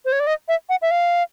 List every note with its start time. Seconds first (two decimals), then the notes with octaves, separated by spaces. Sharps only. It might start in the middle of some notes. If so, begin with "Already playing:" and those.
0.05 C5
0.12 C#5
0.20 D5
0.27 D#5
0.48 E5
0.69 F#5
0.82 E5
0.91 F5